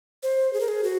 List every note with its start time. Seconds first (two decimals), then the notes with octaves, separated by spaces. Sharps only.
0.23 C5
0.53 G#4
0.61 A#4
0.68 G#4
0.84 F#4